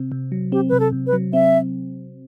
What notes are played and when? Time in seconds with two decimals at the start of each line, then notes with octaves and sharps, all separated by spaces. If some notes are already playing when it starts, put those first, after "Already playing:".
Already playing: C3 C4
0.12 C3
0.32 F#3
0.52 C4 G4
0.69 C3 B4
0.80 A4
0.92 C3
1.07 B4
1.13 F#3
1.33 C4 E5